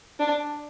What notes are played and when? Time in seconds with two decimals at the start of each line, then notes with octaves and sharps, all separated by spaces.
0.19 D4